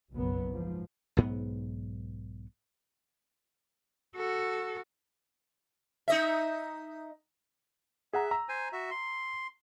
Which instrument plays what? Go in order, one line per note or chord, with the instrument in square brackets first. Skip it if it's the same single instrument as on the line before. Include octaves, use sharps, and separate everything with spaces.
[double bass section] F#1 B1 F#2 F#3 B3
G#2 F3
[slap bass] B1 G#2 B3
[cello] F#4 A4
[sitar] D#4 D#5 E5
[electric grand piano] G#4 F#5 A#5 [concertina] E5
[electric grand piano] A#5 E6
[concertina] C5 G#5
F#4 E5
C6